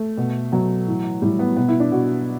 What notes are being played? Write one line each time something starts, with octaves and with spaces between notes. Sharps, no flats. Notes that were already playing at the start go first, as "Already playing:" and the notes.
Already playing: A3
B2
B2 F#3
A2 E3
A2 E3 G3
B3
B2 B3
E4
D4
B2 F#4